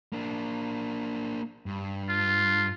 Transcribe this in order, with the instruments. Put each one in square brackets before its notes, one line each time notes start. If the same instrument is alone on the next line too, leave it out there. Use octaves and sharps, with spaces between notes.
[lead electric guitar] A#3 D4
G2
[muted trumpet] F4